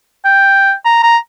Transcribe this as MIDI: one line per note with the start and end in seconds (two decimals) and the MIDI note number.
0.25 0.73 79
0.85 1.03 82
1.03 1.17 82